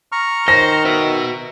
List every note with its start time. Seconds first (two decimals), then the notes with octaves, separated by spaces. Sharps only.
0.12 A#5 C#6 F6
0.48 D#3 C5 A#6
0.85 F#4 B4 E5